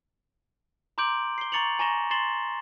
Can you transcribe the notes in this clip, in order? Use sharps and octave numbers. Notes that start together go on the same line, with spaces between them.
A#5 C6 D6 G6 D7 F#7
C7 G7
A#5 C#6 A6 C#7 F7 F#7
G#5 A#5 C#6 A#6 E7 G7
C6 A6 C7 E7 F#7 G7